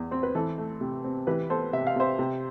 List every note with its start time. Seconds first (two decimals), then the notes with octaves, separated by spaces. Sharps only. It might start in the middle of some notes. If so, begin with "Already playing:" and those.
Already playing: E2
0.11 C4 C5
0.23 B4
0.35 E3 A4
0.58 A3
0.81 C3
1.04 C4
1.27 E3 G4 B4
1.49 B3 A4 C5
1.73 C3 E5
1.87 F5
1.96 C3 C5 E5
2.19 C3